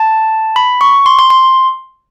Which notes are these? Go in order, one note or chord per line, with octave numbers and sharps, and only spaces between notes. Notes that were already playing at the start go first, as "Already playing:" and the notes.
Already playing: A5
B5
C#6
C6
C6
C6